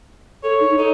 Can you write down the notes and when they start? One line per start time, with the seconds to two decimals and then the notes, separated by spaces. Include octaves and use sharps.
0.44 A4 C#5
0.60 D#4
0.78 D#4 A4